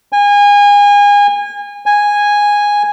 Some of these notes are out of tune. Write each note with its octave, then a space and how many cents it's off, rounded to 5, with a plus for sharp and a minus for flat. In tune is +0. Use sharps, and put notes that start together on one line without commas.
G#5 -30
G#5 -10